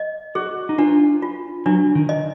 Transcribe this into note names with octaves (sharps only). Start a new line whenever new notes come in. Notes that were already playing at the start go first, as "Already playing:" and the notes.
Already playing: D#5
F#4 G#4
D#4
D4 F4
F4
F#3 D4
D#3
D#5